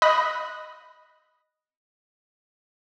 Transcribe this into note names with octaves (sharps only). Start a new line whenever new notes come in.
D#5 B5 D#6 F#6 A#6